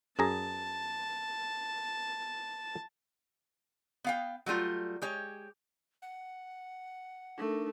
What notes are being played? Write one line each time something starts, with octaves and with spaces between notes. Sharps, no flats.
F#2 G#4 A5 A#5
B3 F5 G5
F#3 G3 A3 F4
G#3 G4 C#5
F#5
A3 D4 D#4 A#4